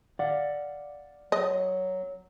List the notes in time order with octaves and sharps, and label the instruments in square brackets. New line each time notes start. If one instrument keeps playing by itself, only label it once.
[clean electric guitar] D5 F5 F#5
[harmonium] F#3 [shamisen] D#5